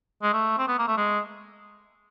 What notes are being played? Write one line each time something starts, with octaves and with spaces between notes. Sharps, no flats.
G#3
A3
C4
B3
A#3
A3
G#3